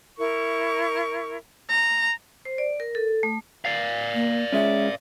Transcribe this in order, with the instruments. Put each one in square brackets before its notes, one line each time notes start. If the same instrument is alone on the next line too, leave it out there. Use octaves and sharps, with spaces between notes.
[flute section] E4 A#4 C#6
[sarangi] A#5
[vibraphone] C5
D5
A#4
A4
A3
[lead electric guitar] D5 F5
[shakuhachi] A#3
[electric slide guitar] G#3 C#4 [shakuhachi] E5